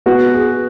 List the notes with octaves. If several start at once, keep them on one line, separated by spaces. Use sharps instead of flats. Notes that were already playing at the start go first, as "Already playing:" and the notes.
B3 F#4
G#4